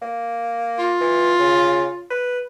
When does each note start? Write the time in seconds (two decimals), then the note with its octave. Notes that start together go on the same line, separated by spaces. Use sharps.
0.02 A#3
0.79 F4
1.01 E3
1.39 C#3
2.10 B4